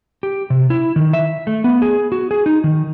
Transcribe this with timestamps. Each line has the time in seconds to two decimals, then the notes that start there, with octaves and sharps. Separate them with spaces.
0.23 G4
0.50 C3
0.70 E4
0.96 D#3
1.13 E5
1.47 A3
1.64 B3
1.82 G#4
2.12 F#4
2.31 G#4
2.46 D#4
2.64 D#3